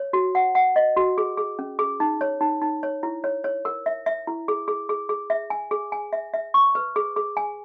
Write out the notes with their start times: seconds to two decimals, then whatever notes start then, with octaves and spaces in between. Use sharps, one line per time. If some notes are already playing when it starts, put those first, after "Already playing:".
Already playing: C#5
0.13 F#4
0.35 F#5
0.55 F#5
0.76 D#5
0.96 F#4
1.18 G#4
1.37 G#4
1.59 C#4
1.79 G#4
2.00 D#4
2.21 C#5
2.41 D#4
2.61 D#4
2.83 C#5
3.03 E4
3.24 C#5
3.44 C#5
3.65 A#4
3.86 E5
4.06 E5
4.27 E4
4.48 G#4
4.68 G#4
4.89 G#4
5.09 G#4
5.30 E5
5.50 G#5
5.71 G#4
5.92 G#5
6.13 E5
6.34 E5
6.54 C#6
6.75 B4
6.96 G#4
7.16 G#4
7.37 G#5